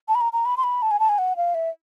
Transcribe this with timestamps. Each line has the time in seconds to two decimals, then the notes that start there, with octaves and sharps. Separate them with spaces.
0.08 A5
0.15 B5
0.21 A#5
0.33 A#5
0.45 B5
0.57 C6
0.63 B5
0.82 A5
0.91 G#5
0.99 A5
1.09 G#5
1.18 F#5
1.36 F5
1.54 E5